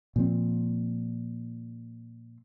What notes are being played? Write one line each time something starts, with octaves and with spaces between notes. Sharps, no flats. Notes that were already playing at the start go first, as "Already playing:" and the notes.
A#2 F3 C4